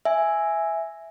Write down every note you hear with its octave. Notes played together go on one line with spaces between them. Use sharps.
E5 G#5